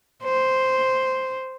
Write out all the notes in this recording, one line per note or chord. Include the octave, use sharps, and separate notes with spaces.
C5